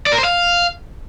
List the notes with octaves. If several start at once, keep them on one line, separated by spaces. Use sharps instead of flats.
D5
A#4
C5
F5